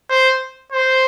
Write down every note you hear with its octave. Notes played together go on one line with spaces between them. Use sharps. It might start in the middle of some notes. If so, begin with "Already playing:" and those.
C5
C5